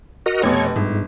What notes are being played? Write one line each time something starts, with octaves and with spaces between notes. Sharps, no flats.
F#4 A#4 D#5
F1 B2 C#5
G1 G#2